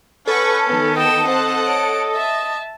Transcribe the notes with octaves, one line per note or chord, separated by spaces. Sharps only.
C#4 A4 B4 F#5 C#6
D#3 B3
D#5 G5 E7
C4 C5 F#5 A5
C#5 D7
E5 A5